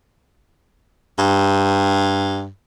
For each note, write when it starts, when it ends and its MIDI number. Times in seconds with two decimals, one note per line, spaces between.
1.19 2.48 43